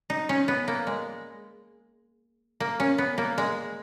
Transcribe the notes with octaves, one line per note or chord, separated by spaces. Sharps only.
D#4
C#4
B3
A#3
G#3
A#3
C#4
B3
A#3
G#3